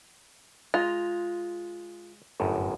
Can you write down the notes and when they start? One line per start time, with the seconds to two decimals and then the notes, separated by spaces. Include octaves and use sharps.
0.74 G#3 F4 A#5
2.40 G1 F#2 A2